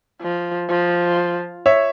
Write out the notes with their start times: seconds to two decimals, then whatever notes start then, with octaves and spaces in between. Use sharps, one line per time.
0.22 F3
0.69 F3
1.66 C#5 E5